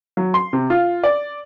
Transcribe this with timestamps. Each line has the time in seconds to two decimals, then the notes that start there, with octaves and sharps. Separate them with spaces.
0.17 F#3
0.34 C6
0.53 C3
0.70 F4
1.03 D5